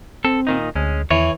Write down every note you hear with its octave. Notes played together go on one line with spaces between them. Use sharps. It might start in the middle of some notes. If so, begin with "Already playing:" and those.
C4 A4
A#2 D#3 D#4
D2 G#3 C#4
E2 E3 C#5